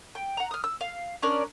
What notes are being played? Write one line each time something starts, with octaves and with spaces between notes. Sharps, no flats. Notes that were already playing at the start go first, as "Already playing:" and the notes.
G5
F#5 A#5
D#6 F6
E6
F5
C#4 D4 A#4 D5